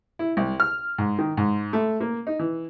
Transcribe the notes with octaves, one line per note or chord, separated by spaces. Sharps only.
E4
C2
F6
G#2
D#3
G#2
A3
A#3
D#4
E3